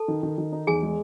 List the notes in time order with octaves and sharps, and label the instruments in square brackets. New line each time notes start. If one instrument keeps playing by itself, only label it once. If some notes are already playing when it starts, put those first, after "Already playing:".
Already playing: [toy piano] A4 A5
[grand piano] D#3
D#3
D#3
D#4
[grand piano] E2 [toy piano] G#4 G#5
[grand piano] G#3